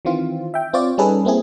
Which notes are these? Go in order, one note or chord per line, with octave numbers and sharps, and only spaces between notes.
D#3 E3 C4 F4
E5 G5
C4 F4 C#5 D5
G3 C#4 D#4 G#4 A4 B4
A#3 C4 E4 G#4